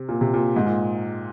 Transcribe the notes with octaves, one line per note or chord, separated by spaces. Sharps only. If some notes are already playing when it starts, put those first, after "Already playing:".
Already playing: C3
A#2
C3
A#2
G#2
A#2